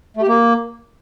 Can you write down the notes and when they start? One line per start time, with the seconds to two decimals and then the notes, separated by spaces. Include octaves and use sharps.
0.17 A3
0.22 G4
0.28 A#3